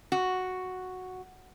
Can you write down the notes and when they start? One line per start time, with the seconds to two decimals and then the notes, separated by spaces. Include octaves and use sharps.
0.12 F#4